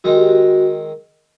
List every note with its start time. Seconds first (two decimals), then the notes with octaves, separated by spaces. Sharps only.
0.04 D#3 G#3 C4 D#4 F#4
0.16 G4
0.29 F#4